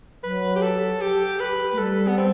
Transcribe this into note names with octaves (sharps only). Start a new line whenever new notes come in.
F#3 B4
G4
A4
G4
B4
A3
G3 A4
B3
C4